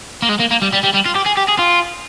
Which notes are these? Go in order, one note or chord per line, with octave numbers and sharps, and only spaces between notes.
A#3
G#3
A#3
A#3
G3
G3
G3
G3
F4
G4
G#4
G4
G#4
F4